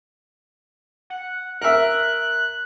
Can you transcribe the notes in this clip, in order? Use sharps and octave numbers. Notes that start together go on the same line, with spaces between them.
F#5
A#4 E5 F#6